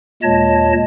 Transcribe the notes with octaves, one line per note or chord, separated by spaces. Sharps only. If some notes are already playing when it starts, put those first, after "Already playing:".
D#2 A#2 G#3 C#5 D#5 A5